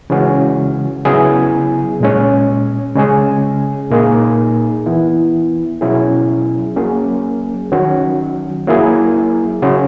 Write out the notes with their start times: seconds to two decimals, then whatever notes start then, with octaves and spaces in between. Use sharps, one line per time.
0.10 C#3 E3 G#3 C#4 F#4
1.05 C#3 F#3 B3 E4 G#4
2.00 A#2 G#3 C#4
2.95 C#3 G#3 C#4 G#4
3.91 A#2 A#3 D#4 G#4
4.86 E3 B3 E4
5.81 B2 F#3 C#4 E4 G#4
6.76 F#3 A#3 C#4 G#4
7.72 D#3 F#3 C#4 F#4
8.67 F#3 A#3 E4 G#4
9.62 C#3 F#3 C#4 F#4